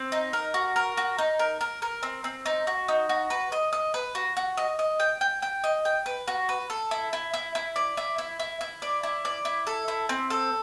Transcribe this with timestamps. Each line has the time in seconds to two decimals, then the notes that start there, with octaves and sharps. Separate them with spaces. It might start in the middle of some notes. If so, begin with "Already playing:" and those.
Already playing: C4
0.12 D#4
0.33 A#4
0.54 F#4
0.76 A#4
0.97 F#4
1.18 D#4
1.39 A#4
1.61 A#4
1.82 A#4
2.03 C4
2.24 C4
2.46 D#4
2.67 F#4
2.88 D#4
3.09 F#4
3.30 B4
3.52 D#5
3.73 D#5
3.94 B4
4.15 F#4
4.37 F#4
4.57 D#5
4.79 D#5
5.00 G5
5.21 G5
5.42 G5
5.64 D#5
5.85 G5
6.06 B4
6.28 F#4
6.49 B4
6.70 A4
6.91 E4
7.13 E4
7.34 E4
7.55 E4
7.76 D5
7.97 E4
8.18 E4
8.39 E4
8.61 E4
8.82 D5
9.03 E4
9.25 D5
9.45 E4
9.67 A4
9.88 E4
10.09 C4
10.30 A4